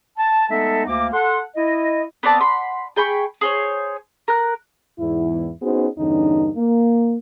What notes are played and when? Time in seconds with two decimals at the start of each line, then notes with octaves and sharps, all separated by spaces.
0.18 A5
0.50 G#3 A3 B3 D#4 A4 E5
0.87 D2 A#3 D6
1.13 A4 F#5 C6
1.56 E4 D#5
2.23 B3 C4 D5 A5
2.40 F#5 B5 C6
2.96 G#4 G5 B5 C#6
3.41 G#4 C5 C#5
4.28 A#4 F#6
4.99 E2 G#2 E4
5.62 B3 C#4 D#4 F#4 G#4 C5
5.99 E2 G2 D3 C#4 D#4
6.57 A#3